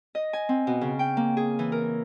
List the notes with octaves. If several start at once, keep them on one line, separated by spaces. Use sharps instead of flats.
D#5
G#5
C4
B2
C#3
G5
A#3
G#4
E3
A#4